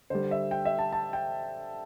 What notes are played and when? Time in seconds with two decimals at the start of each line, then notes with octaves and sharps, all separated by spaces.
0.10 D3 G3 C5
0.31 E5
0.51 G5
0.65 E5
0.79 A5
0.92 A5
1.13 G5